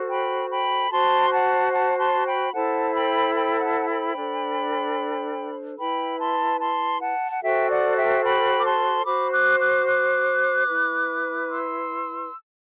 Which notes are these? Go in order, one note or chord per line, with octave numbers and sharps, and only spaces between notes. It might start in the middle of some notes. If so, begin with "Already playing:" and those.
Already playing: F#4 A4 C5
G5 B5
G5 B5
F#4 C5 A5 C6
F#5 A5
F#5 A5
A5 C6
G5 B5
E4 A4 C5 F#5 A5
G5 B5
G5 B5
B5
F#5 A5
A5
G5 B5
D4 A4 C5
E4 B4 G5 B5
A5 C6
A5 C6
F#5 A5
F#5
F#4 A4 C5 E5 G5
D5 F#5
E5 G5
G5 B5
D6
A5 C6
F#4 C5 B5 D6
D6 F#6
D6 F#6
D6 F#6
E4 B4
C6 E6